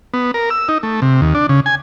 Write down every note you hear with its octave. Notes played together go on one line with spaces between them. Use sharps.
B3
A#4
E6
D#4
A3
C3
D#2
D4
C#3
G#5